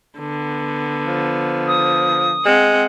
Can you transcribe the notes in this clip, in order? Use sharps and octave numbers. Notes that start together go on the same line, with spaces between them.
D3 B3
F3
D#6
G#3 C4 F#5